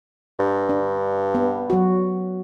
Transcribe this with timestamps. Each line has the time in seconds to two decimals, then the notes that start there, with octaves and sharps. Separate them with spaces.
0.39 G2
0.69 D4
1.35 B3
1.70 F#3 F#4